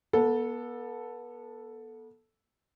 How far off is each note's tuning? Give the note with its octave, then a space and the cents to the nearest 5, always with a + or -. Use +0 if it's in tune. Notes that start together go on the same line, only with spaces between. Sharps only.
B3 -35 A4 +0